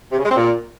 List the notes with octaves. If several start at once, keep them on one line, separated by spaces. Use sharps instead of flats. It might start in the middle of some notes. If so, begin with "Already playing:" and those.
C3
C#3
G#3
C4
A#2